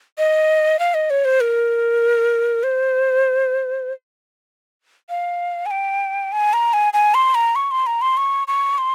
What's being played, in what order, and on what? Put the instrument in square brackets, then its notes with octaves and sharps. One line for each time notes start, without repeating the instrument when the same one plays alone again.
[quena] D#5
F5
D#5
C#5
C5
A#4
C5
F5
G#5
G5
G#5
A#5
G#5
G#5
C6
A#5
C#6
C6
A#5
C6
C#6
C#6
C6